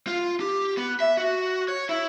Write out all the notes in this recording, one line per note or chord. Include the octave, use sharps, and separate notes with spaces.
F4
G4
B3
E5
F#4
C#5
E4